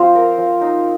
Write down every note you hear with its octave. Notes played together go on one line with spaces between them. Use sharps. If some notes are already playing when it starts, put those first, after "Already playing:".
Already playing: F3 C4 F4
A#4
F3
D#4